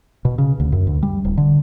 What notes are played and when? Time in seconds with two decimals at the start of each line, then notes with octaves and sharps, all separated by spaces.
0.25 B2
0.38 C#3
0.60 D2
0.72 F#2
0.87 D2
1.03 G3
1.25 D1
1.38 D3